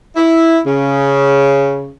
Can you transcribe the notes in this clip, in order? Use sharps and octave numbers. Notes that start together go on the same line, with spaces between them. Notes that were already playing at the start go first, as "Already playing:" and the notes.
E4
C#3